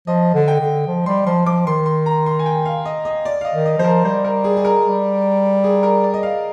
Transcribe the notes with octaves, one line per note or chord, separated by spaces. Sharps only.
F3 D#5
D3
G5
D3
F3
G3 C6
F3 C6
F3 D6
D#3 C6
C6
A#5
C6
G#5
G5
F5
D#5
D#5
D5
F5
D#5
D#3
D#5
F3 C5
A#4
G3 C5
A#4
G#4
G#4
A#4
G3
G#4
A#4
D5
D#5
F5